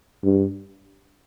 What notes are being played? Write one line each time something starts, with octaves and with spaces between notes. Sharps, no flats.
G2